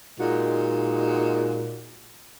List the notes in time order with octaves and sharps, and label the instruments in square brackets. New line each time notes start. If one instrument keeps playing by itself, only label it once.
[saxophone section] A#2 G#3 D#4 F#4